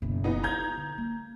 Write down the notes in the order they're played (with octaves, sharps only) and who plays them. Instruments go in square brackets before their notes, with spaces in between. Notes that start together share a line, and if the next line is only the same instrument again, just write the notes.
[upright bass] F#1 B2
[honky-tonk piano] E3 B3 D#4
[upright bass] E4 F4 [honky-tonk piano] A#5 G6 G#6
[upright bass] D3
A#3